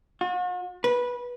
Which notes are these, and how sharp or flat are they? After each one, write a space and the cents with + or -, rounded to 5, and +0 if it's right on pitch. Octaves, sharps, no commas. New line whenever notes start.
F#4 -45
B4 -15